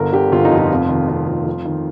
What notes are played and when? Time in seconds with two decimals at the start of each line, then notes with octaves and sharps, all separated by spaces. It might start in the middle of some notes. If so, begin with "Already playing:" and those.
Already playing: G1 D3 A#4
0.13 D3 G4
0.32 G1 F4
0.45 D#4
0.51 F2
0.58 F4
0.71 F1
0.89 D#3
1.08 F1 F4
1.28 F2
1.46 F2
1.65 D#3